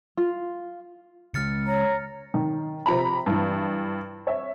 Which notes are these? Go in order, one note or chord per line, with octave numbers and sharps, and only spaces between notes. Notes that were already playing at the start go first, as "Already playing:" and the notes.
F4
C#3 G#3 F6 A6 C#7
C#5 A#5
D#3
C3 F3 A#5 B5
G2 E3
C#5 E5